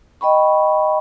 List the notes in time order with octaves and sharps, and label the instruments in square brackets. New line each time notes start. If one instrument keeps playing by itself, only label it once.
[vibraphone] D#5 G5 B5 C#6